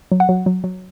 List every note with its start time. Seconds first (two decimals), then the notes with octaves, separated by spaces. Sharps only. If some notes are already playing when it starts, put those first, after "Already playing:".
0.12 F#3
0.20 F#5
0.29 F#3
0.46 F#3
0.64 F#3